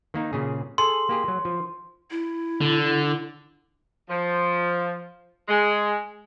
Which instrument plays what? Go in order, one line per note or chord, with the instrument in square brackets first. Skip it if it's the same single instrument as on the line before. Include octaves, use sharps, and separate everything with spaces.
[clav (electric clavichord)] D#3 A#3 D#4
A#2 C#3 G#4
[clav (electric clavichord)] G#4 A4 [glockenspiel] C6
[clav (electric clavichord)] A#3 G4 G#4
F#3
F3
[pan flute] E4
[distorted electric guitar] D3
[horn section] F3
G#3